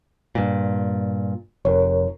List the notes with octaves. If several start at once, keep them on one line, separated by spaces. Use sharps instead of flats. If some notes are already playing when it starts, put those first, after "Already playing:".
G2 A#2
F1 A#4 C#5